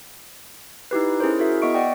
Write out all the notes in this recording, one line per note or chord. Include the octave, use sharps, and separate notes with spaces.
D#4 E4 G4 B4
C#4 E4 G#4 A#4 C5
E4 F#4 G#4 A#4 E5
B3 D#5 E5 C#6 D7
D5 D#5 F#5 G5